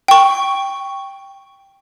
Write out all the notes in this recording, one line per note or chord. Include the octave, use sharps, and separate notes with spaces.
G5 C#6